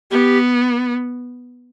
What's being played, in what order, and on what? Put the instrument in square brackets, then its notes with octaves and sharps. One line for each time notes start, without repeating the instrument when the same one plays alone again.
[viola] B3 [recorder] G4